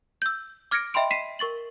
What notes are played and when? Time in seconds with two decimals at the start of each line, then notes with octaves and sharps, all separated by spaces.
0.22 E6 G6
0.71 D6 F6 G#6 A#6 C#7 D7
0.94 D#5 E5 G5 B5 C6 D7
1.11 B6 C7 D#7 E7
1.39 A#4 C#6 A6 F#7